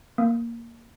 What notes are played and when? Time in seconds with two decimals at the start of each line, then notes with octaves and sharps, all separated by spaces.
0.18 A#3